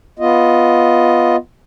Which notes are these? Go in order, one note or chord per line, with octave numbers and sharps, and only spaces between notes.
B3 F4 D#5